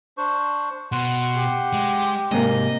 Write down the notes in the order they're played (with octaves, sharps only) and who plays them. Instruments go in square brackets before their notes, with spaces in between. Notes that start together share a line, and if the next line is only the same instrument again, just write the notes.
[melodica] D4 C5 C#6
[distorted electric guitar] B2 [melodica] F#5 C6
[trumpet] G4
[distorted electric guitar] G#3
[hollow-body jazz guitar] G#2 C3 A#3 [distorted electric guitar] D#5